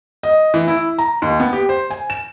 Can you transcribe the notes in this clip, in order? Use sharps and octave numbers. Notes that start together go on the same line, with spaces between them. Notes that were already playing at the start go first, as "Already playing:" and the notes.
D#5
E3
E4
A#5
D#2
B3
G4
C5
G#5
E7